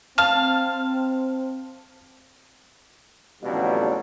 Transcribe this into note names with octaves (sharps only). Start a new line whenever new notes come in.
C4 F5 A5 F6
A1 F2 B2 D3 F#3 G3